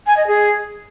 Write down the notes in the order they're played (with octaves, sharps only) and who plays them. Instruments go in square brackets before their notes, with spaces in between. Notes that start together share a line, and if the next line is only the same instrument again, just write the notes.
[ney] G#5
D#5
G#4